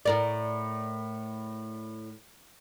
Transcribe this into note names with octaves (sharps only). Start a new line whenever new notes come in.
A2 A#4 D5